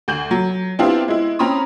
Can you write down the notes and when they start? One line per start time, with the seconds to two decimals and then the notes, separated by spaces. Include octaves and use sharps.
0.08 D2 G6 F#7
0.31 F#3
0.79 B3 C4 D4 E4 F4 G4
1.08 G#3 E4
1.39 C4 C#4 A#5 B5 D#6